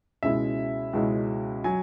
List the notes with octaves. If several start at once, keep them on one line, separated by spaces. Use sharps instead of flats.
C#2 B2 G#3 C#4 E4 E5
C#2 B2 G#3 C#4 E4
F#3 G#5